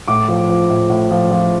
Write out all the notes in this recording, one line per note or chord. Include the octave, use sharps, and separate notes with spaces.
A2 D6
F3
F3
A2
A2
F3
F3